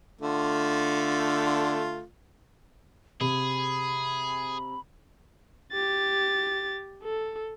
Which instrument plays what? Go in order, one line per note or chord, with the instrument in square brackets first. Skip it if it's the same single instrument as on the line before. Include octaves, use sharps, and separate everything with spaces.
[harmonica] D3 A3 F4
[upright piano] C3 [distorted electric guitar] G#4 [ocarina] B5
[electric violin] G4 A6
A4